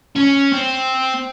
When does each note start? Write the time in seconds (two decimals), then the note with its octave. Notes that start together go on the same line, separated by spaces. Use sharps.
0.16 C#4
0.53 C4